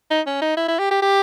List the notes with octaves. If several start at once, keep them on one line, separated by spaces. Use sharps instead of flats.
D#4
C#4
D#4
E4
E4
G4
G4
G4